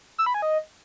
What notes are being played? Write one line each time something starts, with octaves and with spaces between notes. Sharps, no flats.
E6
B5
G#5
D#5